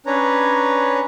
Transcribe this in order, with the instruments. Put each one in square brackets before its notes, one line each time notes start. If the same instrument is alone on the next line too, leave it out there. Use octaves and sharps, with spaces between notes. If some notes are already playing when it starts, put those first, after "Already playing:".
[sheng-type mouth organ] C#4 D4 B4 C#5 A#5